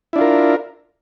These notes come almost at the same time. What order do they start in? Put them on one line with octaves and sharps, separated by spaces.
E4 D4 F4 A#4